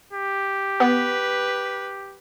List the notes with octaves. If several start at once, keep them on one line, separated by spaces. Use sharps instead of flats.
G4
B3 B4